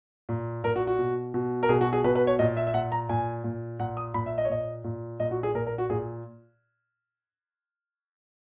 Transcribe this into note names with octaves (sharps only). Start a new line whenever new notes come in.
A#2
A#2 A#4
F#4
F#4
B2
B2
A#4
B2 G#4
F#4
G#4
B2 B4
B4
C#5
A#2 D#5
E5
E5
A#2 F#5
A#5
A#2 G#5
A#2
A#2 F#5
D#6
A#2 B5
E5
D#5
C#5
A#2 D#5
A#2
A#2 D#5
F#4
G#4
A#2 A#4
A#4
F#4
A#2 G#4